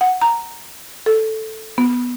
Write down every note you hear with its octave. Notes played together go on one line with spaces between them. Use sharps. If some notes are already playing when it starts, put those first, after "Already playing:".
F#5
A#5
A4
B3